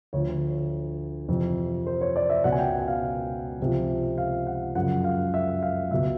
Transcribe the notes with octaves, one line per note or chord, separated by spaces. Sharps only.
D2 D3 F3 C#5
F2 C3 E3
C5
C#5
D5
E5
C#2 B2 F#5
G#5
G5
F#5
F5
C#2 C3 F3
F5
F#5
F#2 C#3 F3 F#5
F5
E5
F5
C#2 B2 E5